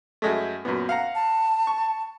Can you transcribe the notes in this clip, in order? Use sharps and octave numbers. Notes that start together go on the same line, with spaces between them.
F#2 G#3 A3
F#2 A#2 B3
F5 F#5 A#5
A5
C#6